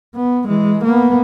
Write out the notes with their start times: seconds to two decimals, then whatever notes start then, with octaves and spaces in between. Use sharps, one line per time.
0.15 B3
0.46 E3 G#3
0.85 A#3 B3